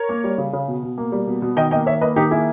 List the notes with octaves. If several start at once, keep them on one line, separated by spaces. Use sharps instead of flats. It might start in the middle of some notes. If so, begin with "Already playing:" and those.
Already playing: A#4 C#5
A#3
G3
C#3
C#3
B2
B2
A#3
G3
B2
B2
D#3 D#5 G5
A#3 D#5 G5
D#3 C#5 E5
A#3 B4 D#5
D#3 D#4 G4
A#3 E4 G#4